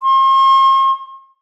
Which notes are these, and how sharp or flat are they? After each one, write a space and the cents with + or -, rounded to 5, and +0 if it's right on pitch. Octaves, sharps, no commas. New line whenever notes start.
C6 +45